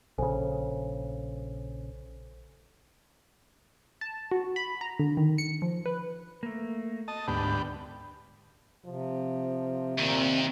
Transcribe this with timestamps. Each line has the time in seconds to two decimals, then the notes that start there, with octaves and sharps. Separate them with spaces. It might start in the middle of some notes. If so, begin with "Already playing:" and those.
0.18 A#1 C#3 A4 C5 G#5
4.01 A5
4.31 F#4
4.56 B5
4.81 A#5
4.99 D3
5.17 D#3
5.38 C#7
5.62 F3
5.86 B4
6.43 A3 A#3
7.08 D#5 A5
7.28 D2 G#2 B3 G4
8.86 C3 F3
9.98 D#2 A#2 D#3 C4